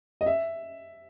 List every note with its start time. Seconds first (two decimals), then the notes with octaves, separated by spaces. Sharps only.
0.21 D#5
0.26 E5